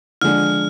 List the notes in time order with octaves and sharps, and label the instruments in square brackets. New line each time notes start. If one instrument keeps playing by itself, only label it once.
[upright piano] D3 F3 G#3 D4 [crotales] F6